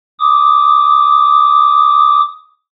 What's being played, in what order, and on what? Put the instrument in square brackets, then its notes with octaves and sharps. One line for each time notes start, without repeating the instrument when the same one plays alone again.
[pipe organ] D6 D#6